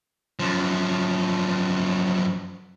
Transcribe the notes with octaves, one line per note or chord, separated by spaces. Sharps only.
F#2 F3